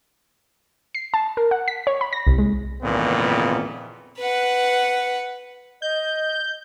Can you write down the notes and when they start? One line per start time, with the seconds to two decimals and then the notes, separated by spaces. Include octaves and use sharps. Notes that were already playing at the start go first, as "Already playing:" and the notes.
0.95 C7
1.14 A5
1.37 A#4
1.51 F#5
1.68 B6
1.87 C#5
2.01 B5
2.13 A#6
2.27 C2
2.39 G#3
2.83 G#1 F2 A#2 C#3 E3 B3
4.18 B4 F#5
5.82 D#5 G6